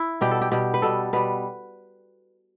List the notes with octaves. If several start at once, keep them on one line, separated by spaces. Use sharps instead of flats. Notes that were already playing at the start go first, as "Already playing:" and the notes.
Already playing: E4
B2 G3 G4
A4
G4
B2 G3 G4
B4
B2 G3 A4
B2 G3 B4